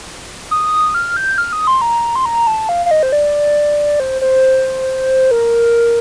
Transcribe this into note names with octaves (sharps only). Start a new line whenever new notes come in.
D#6
F6
G6
F6
D#6
C6
A#5
C6
A#5
A5
F5
F5
D#5
C5
D5
C5
C5
A#4